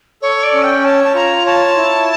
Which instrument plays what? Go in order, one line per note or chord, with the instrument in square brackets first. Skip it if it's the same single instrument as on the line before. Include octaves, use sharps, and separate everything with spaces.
[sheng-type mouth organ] A4 [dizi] C#5
[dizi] D5
[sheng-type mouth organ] C#4
[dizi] G5
[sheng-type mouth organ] C#5 [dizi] A5
[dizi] A5
[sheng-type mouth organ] F4 [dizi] A#5
[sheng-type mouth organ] C#5 [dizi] A5
[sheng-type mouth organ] E4